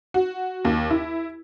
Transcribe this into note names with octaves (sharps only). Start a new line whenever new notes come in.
F#4
D#2
E4